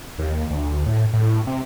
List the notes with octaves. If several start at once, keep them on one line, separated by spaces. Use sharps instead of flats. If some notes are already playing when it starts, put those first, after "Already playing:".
D#2
D2
A2
A2
C3